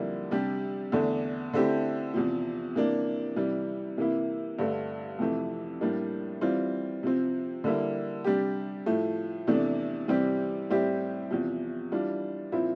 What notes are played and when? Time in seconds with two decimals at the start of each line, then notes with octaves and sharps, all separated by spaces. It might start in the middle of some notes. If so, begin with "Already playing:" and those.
Already playing: F2 D3 G3 A#3 E4
0.31 C3 G3 D4 G4
0.92 E2 D3 A3
1.53 D3 A3 C4 E4 G4
2.14 E2 C3 F3
2.75 C3 E3 A#3 D4
3.36 C3 E3 G3
3.97 C3 E3 A#3 E4
4.59 G2 D3 A3
5.19 F2 C3 E3 A3
5.81 A2 G3 A#3 D4
6.41 E3 G3 C4 F4
7.03 C3 F3 C4
7.64 D3 G3 A#3 E4
8.24 C3 G3 D4 G4
8.86 A2 F3 A3
9.47 E2 C3 E3 A3 D4
10.08 C3 E3 G3 C4 G4
10.70 A2 G3 C4 E4 G4
11.31 E2 C3 F3
11.92 E3 G3 D4 F4
12.52 A#2 F3 C4 E4